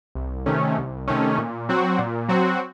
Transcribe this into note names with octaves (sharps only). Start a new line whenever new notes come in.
C2
C3 D#3 A3 C#4
C2
C3 D#3 A3 C#4
A#2
F#3 C4 F#4
A#2
F#3 C4 F#4